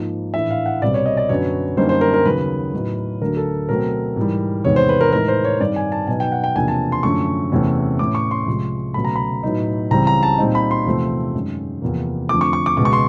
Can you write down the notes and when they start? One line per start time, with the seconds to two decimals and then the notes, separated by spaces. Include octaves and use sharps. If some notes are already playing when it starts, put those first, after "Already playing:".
Already playing: G#2 F3 A#3 D#4
0.34 A2 E3 A3 D4 E5
0.51 F5
0.66 F#5
0.82 C2 B2 G3 C4 D5
0.94 C#5
1.06 D#5
1.17 D5
1.29 F#2 D3 F#3 B3 C#5
1.77 F#2 D3 G3 A#3 D#4 C5
1.89 C5
2.01 A#4
2.14 A#4
2.25 D#2 C#3 F#3 B3 B4
2.74 A2 F#3 B3 D#4
3.22 D2 D3 F#3 A3 A#4
3.37 A4
3.69 B2 F#3 A3 C4 A#4
4.16 G#2 E3 G3
4.64 E2 C3 D#3 G#3 B3 C#5
4.76 C5
4.89 B4
5.01 A#4
5.12 A2 E3 G#3 B3 D#4 A#4
5.28 C5
5.44 C#5
5.60 G2 D#3 G3 C4 D#4 D5
5.76 G#5
5.92 A5
6.07 B2 F#3 B3 D#4 G#5
6.20 G5
6.32 F#5
6.44 G5
6.55 E2 C3 F3 A#3 D4 G#5
6.68 A5
6.92 C6
7.03 F#2 D3 F3 A3 C#6
7.52 E2 C3 E3 A3 C#4
7.99 A2 E3 A3 C#4 D6
8.15 C#6
8.31 C6
8.47 C2 C3 F3 G#3
8.94 C#2 B2 F#3 A3 B5
9.05 A#5
9.16 B5
9.43 A2 F#3 B3 D#4
9.91 C#2 C#3 E3 G3 C4 A#5
10.07 A#5
10.23 A5
10.38 A#2 G3 C4 D#4
10.55 B5
10.71 C6
10.86 E2 C3 F3 A3 C4
11.34 F#2 D#3 G#3
11.82 E2 C3 F3 A#3
12.29 F2 D3 F3 A3 D6
12.41 C#6
12.53 C#6
12.66 D6
12.77 C#2 B2 G#3 D6
12.85 C#6
12.93 C6